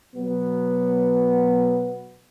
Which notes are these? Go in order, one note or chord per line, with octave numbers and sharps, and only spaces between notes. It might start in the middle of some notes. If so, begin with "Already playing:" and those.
B2 F#3 B3